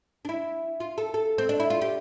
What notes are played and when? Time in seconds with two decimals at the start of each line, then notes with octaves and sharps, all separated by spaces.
0.25 D4
0.29 E4
0.80 F4
0.98 A4
1.14 A4
1.38 C4
1.49 D4
1.60 E4
1.70 F4
1.82 G4